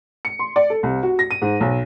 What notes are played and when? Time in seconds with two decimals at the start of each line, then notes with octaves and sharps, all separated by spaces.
0.25 C#7
0.39 C6
0.56 D5
0.70 A4
0.83 C2
1.03 F#4
1.19 A#6
1.31 D#7
1.42 G#2
1.61 B1